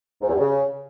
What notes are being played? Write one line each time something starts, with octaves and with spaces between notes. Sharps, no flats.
G#2
E2
G2
C#3